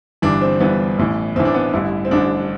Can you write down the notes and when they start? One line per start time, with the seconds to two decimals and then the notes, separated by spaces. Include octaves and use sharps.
0.22 G1 G2 E3 D4
0.42 C4
0.60 G1 G2 E3 B3
0.98 A1 A2 E3
1.35 A1 A2 E3 C4
1.45 D4
1.54 B3
1.73 A1 G2 D3 E4
2.05 C4
2.11 A1 G2 D3 D4